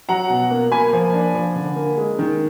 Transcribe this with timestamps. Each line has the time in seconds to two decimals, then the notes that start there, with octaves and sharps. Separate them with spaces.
0.09 F#3 F#5 A#5
0.30 B2
0.51 A#3
0.72 A#3 G#5 B5
0.93 F3
1.14 D4
1.34 F3
1.56 D3
1.76 A#3
1.97 G#3
2.19 D#3